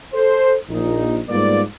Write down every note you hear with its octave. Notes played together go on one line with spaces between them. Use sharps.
A4 C5
A#1 A#2 D#4
G#2 G3 A#3 B3 F4 D5